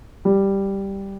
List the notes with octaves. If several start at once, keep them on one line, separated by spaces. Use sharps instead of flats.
G3